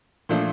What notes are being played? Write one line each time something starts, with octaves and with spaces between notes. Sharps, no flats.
A#2 F3 A3 D4